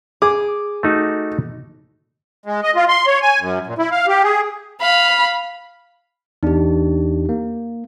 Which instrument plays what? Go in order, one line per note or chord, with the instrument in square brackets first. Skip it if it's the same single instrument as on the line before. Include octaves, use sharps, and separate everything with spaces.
[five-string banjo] G#4 [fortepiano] D6
[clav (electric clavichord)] A3 D#4 F#4
[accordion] G#3
D#5
F4
C6
C#5
G#5
F#2
A#2
E4
F5
G4
G#4
[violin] F5 B5
[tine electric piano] E2 D4 [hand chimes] D#4 G4
[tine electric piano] A#3